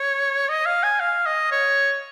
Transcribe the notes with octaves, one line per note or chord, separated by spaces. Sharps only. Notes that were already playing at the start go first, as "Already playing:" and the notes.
Already playing: C#5
D#5
F5
G#5
F5
D#5
C#5